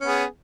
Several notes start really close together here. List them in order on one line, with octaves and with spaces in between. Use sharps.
C#4 B3 G#4